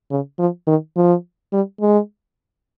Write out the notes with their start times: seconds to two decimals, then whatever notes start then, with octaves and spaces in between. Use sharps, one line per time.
0.11 C#3
0.39 F3
0.67 D#3
0.97 F3
1.53 G3
1.81 G#3